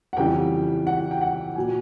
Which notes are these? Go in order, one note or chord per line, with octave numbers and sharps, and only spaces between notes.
F#5
F2 C#3 E3 G3 G5
F#5
G5
F#5
A#2 F#3 G#5